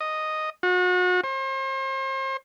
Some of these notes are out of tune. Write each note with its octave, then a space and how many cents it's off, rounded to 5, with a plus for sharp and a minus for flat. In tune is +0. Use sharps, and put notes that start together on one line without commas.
D#5 -5
F#4 -35
C5 +40